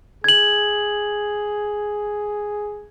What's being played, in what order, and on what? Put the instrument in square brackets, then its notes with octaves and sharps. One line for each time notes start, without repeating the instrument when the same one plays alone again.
[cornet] G#4 [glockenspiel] G#6 F#7